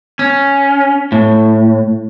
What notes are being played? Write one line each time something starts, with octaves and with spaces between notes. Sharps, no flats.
C#4
A2